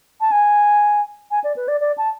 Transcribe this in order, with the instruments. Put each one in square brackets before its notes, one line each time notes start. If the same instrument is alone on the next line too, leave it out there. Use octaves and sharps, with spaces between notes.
[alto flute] A5
G#5
G#5
D5
B4
D5
D5
A5